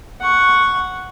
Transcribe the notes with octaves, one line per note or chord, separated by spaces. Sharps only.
F#5 C#6